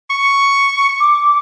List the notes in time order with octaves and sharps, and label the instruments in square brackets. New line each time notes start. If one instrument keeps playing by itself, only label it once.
[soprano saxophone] C#6
[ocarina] D6